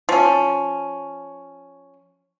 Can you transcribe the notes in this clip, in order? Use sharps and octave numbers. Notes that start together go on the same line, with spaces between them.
F3 C#4